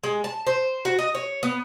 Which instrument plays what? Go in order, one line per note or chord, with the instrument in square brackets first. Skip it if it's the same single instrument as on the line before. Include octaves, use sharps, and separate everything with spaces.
[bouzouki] G#3
A5
C5
F#4
D#5
C#5
B3